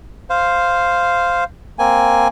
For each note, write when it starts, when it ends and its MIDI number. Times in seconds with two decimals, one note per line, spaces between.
0.30 1.44 72
0.30 1.44 77
1.79 2.28 58
1.79 2.28 60
1.79 2.28 80